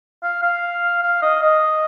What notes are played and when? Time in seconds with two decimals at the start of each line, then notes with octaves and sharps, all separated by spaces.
0.23 F5
0.42 F5
1.03 F5
1.22 D#5
1.42 D#5